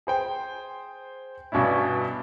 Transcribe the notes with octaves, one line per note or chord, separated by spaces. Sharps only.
G#4 C5 G5
G2 B2 C#4 D4 E4